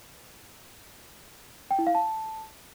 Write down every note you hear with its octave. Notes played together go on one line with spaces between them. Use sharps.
G5
E4
F5
A5